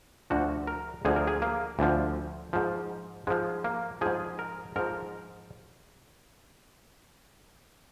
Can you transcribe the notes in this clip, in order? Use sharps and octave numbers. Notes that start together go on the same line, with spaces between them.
D2 D3 F3 F#4
A#4
D2 D3 F3 G#4
A#4
G#4
A#3
D2 D3 F3
G#2 F3
G#2 F3 G#3
A#3
G#2 F3 G#4
A#4
G#2 F3 A#4